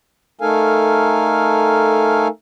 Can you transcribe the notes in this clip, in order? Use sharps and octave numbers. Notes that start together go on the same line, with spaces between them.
A3 D#4 A4 A#4 F5 G#5